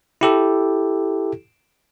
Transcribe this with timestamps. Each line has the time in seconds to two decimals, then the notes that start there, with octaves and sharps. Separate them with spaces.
0.21 E4 G4 A4